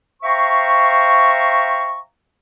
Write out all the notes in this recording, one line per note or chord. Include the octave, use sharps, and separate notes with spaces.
C5 E5 F5 G5 A#5 C#6